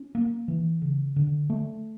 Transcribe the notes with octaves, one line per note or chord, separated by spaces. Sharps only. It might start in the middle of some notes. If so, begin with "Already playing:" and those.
Already playing: C#4
A#3
E3
C#3
D3
A3